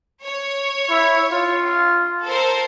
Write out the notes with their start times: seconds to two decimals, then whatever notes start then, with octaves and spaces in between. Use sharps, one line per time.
0.24 C#5
0.89 E4
1.32 F4
2.25 A4 A#4 C5